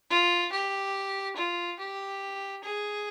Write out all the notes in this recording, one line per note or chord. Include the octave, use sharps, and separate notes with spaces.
F4
G4
F4
G4
G#4